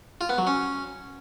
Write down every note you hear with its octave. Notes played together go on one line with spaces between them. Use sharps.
F4
B3
F#3
C#4